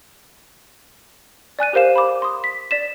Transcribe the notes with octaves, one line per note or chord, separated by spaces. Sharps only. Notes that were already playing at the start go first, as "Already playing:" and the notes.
D5 G#5 F#6 D#7
G4 A#4 C5 F5 E7
B5 D6
C6 D#6
B6
D5 B6 E7